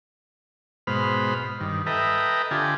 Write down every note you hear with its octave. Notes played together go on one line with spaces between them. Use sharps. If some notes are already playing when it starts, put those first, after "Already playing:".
G#2 B2 C5 B5 F6
G2 D#3
A4 B4 D#5 E5 G5 A#5
D3 F4 G4 A4 G#5